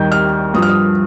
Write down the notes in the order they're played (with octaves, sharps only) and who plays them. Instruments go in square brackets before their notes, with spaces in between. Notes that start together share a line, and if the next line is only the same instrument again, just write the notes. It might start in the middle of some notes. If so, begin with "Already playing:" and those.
Already playing: [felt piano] D#2 D#3 G3 G6
F6
G2 F3 D#6
F6
D#6